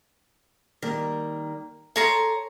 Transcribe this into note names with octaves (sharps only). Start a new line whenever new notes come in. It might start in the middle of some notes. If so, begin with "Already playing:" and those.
D#3 G3 A#3 A#4
G#4 A4 C#5 A5 A#5 C6